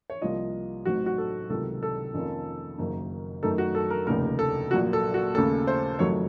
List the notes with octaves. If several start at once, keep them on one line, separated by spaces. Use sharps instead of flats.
C#5
C2 C3 F3 A#3 F4 D#5
A1 A2 F#3 C4 D#4 F#4
F#4
A4
C#2 C3 D#3 F#3 A4
A4
F2 D#3 A#3 C#4 F4
F#1 F#2 D#3 A#3 D#4
F#2 D#3 A3 D#4 A4
F#4
A4
A#4
F1 D#2 C#3 A3 D#4 A#4
A4
A#1 A#2 F#3 A#3 F#4
A4
F#4
D#2 C#3 A3 C#4 A4
C5
F#1 F2 D#3 F#3 A3 C#5